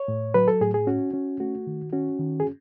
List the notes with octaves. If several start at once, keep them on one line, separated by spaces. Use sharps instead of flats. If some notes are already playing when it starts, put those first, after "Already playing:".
Already playing: C#5
A2
F#3 B4
A4
A2 G#4
G#4
C#4 F#4
C#4
A3 F#4
D#3
C#4 F#4
D#3
G#4